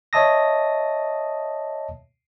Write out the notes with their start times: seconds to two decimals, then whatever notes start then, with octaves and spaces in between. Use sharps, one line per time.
0.13 C#5 D#5 E5 A5 D#6 A#6